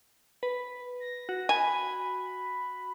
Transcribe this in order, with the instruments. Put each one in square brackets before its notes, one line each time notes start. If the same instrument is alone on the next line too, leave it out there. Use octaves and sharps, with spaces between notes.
[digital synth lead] B4
[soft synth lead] A#6
[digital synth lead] F#4
[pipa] G#5 [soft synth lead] B5